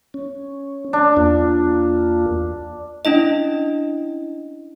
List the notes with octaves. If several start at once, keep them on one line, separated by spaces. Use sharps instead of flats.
C#4
D4
E2 A#3 F4
C#4 D4 E4 D#5